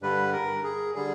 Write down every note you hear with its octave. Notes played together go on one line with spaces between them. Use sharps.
G2 D3 G3 B4
A#4
G#4
D3 G3 G#4